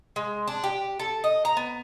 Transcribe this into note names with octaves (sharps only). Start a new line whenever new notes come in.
G#3
D4
G4
A4
D#5
A#5
B3